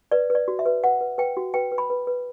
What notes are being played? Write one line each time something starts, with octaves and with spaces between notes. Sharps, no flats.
B4 D5
B4
D5
F#4
E5
B4
B4 F#5
B4
B4 G5
F#4
B4 G5
B4
B5
B4
B4